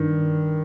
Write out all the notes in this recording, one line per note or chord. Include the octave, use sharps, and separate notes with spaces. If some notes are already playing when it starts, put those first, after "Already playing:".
Already playing: G2 D#3